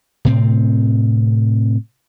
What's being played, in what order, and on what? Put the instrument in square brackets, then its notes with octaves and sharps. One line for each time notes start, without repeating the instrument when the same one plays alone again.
[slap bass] A2 C3 C4